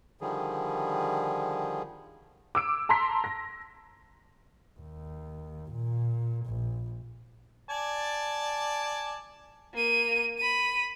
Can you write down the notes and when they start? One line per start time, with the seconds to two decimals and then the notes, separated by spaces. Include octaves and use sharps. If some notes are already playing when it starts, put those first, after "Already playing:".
0.21 D3 D#3 F3 G3 G#4
2.55 D6 E6 D7
2.89 A5 A#5 C6 B6
3.24 A#6
4.79 D#2
5.71 A#2
6.46 A#1
7.69 D5 G#5 A5
9.74 A#3 D#7
10.38 B5 D#7